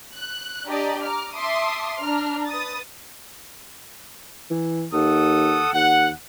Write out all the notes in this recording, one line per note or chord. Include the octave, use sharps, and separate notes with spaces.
F#6
D4 G4 D5 D#5 A#5
A#5 D6 F6
E5 A5 C6 D6 D#6
D4 A#5 F6
B4 D#6 A6
E3
D#2 A4 F#5 D#6
D#2 F#5